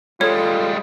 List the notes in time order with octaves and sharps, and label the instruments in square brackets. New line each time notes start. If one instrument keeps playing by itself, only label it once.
[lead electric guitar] G3 G#3 [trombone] F4 [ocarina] A4 [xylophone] C#5